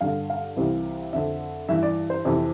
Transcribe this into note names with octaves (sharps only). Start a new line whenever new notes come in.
G2 D3 F5
F5
C2 C3 E3
F2 D3 E5
G2 E3 E5
D5
C5
F2 C3 E3